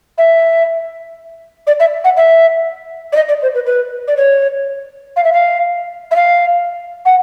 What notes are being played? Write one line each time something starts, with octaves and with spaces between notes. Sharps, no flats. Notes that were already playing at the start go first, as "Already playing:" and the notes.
E5
D5
E5
F#5
E5
D5
D#5
D5
C5
B4
B4
D5
C#5
F5
E5
F5
E5
F5
F#5